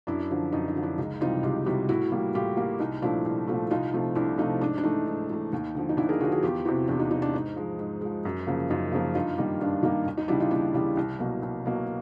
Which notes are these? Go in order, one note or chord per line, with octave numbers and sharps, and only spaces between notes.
F#2 D4 E4
D3 F3
F#2 D#4
D#4
D3 F3
D4 E4
C#2 D#4
C3 E3 G3 D#4 F4
C#2 F4 G4
C3 E3 G3 E4 F#4
A2 E4 F#4
E3 G3 A#3
A2 F4 G4
E3 G3 A#3
C2 D#4
A#2 F3 A3 D4 E4
C2
A#2 F3 A3
C2 D#4 F4
C3 F3 A3
C2 D4 E4
C3 F3 A3 D#4
G#2 D4
D4
E3 A3 D#4
G#2
E3 A3
D#2
D3 F3
D#4
D#2 D4 E4
G#4 A#4
D3 F3 F#4 G#4
F#4 G#4
E2 F4 G4
C3 E3 E4 F#4
E2 D4 E4
D#4
C3 E3 D#4
D4
G#2 D#4
F3 G#3
G#2
F3 G#3
F#2
C#3 F3 A#3
F#2 D#4 F4
C#3 F3 A#3
G2 D#4 F4
D#3 G3 A#3 D#4
G2 D4
D#3 G3 A#3 D#4
D#2
D#4
C#3 E3 G3 D4 E4
D#4 F4
D#2 D4 E4
C#3 E3 G3
C2
B2 F#3 A#3
C2
B2 F#3 A#3